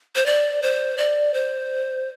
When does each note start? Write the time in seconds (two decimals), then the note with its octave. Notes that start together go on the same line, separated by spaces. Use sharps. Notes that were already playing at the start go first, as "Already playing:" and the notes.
0.16 C5
0.26 D5
0.62 C5
0.98 D5
1.34 C5